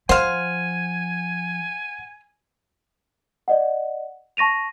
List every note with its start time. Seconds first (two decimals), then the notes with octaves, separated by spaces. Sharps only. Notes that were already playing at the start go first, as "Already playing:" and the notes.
0.09 F3 C5 F5 F#5 G#5
3.48 D5 D#5 F#5
4.37 A5 C#6 A#6 D#7 F7